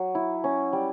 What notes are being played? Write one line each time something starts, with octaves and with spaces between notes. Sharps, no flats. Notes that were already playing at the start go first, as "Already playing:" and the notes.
Already playing: F#3
E4
C#4
G3